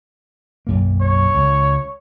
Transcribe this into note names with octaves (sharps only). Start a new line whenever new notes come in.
B1 F#2 A#3
C#5
C#2